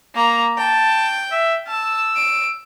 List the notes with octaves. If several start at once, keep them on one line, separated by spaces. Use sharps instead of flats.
A#3 A#5
G5 A5
E5
A5 E6
D7